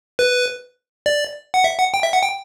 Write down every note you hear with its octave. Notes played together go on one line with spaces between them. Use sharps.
B4
D5
F#5
E5
F#5
G5
E5
F#5
G5